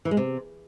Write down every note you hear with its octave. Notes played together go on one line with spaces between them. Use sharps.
E3
G#3
C3